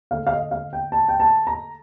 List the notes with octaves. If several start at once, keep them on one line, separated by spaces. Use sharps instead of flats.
D3 A3 F5
F5
D#5
F5
G5
A5
G5
A5
A#5